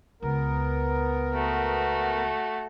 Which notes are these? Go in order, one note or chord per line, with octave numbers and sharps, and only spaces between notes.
C#2 B3 A#4
A3 F#4